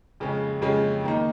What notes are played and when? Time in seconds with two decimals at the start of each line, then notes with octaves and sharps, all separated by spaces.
0.20 F2 C#3 G#3 C#4
0.61 F2 C#3 G#3 C#4
1.04 D#3 A#3 D#4